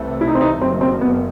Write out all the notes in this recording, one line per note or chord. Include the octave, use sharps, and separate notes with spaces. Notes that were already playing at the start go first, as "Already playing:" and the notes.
Already playing: C2 C3 E3 A3
E4
D#4
C4
D#4
F#1 F#2 D#3 C4
C4
B3